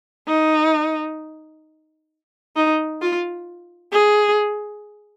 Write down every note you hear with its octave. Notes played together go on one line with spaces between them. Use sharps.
D#4
D#4
F4
G#4